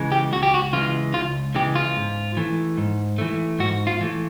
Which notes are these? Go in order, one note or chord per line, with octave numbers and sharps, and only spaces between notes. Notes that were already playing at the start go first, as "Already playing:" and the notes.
Already playing: C#3 E3 G#3
G4
C#2 F#4
G4
F#4
C#3 E3 G#3 F4
C#2 F4
C#3 E3 G#3 G4
F4
G#2
E3 A3
G#2
E3 A3
G#2 F#4
F4
E3 A3